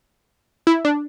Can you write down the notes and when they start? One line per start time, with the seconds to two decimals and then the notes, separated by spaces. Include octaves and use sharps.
0.67 E4
0.85 D4